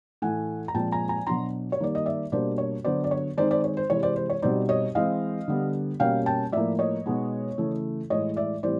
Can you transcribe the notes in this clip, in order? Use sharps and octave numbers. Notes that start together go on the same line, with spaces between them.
A2 E3 A3 F#5 G#5
A#5
A#2 F3 G#3 C4 G5 A5
G#5 A#5
G#5 A#5
B2 F#3 B3 D4 A#5 C6
C#5
D#3 G3 A#3 D5
D#5
D5 E5
B2 G3 A#3 D4 C5 D5
C#5
D3 F#3 B3 C5 D5
D5
C#5
D#3 G#3 C4 D#4 C5 D5
C5 D5
C#5
C5
C3 E3 G#3 C#5
C5 D5
C5
C#5
B2 G3 C4 D#4 C5 D5
C#5 D#5
E3 G#3 C4 D#5 F5
D3 G3 B3
B2 G3 A#3 C#4 F5 G5
G5 A5
A2 F3 A#3 D5 E5
C#5 D#5
B2 G#3 B3 D#4
C#3 E3 A3
A2 E3 G#3 C#5 D#5
D5 E5
A2 E3 G3 C4 C5 D5